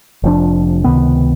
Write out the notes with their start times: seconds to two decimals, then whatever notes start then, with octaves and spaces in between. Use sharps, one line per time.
0.23 F1 F3 D4
0.84 C#2 C3 D#3 B3